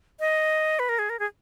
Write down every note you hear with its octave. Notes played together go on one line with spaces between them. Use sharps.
D#5
B4
A#4
G#4
A#4
G#4